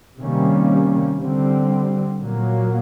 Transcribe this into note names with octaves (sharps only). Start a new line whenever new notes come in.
C3 D#3 G3 A#3 C#4
D3 G3 C4
A#2 F#3 A#3